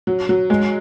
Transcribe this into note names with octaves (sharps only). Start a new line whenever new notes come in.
F#3
F#3
G#3